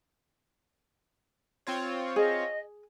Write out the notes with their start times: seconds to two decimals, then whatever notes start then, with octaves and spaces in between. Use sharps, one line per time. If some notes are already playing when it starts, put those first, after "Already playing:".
1.67 C4 F4 C#5
2.16 G#4 D#5